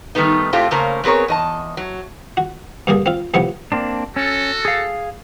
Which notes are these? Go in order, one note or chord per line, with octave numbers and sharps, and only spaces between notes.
D#3 G3 A3 B3 D#4
A2 A3 C4 F4 G4 A4
C#3 A3 A#3 C#4 A#4 C5
B3 C4 G#4 A#4 C#5
E2 D#5 A5
F#3
F#4
G2 D3 A#3 G#4
C4 F4
C#2 A2 C3 F3 B3 C#6
A#3 C4 D4
C#4 F#4 A4
G#4 F5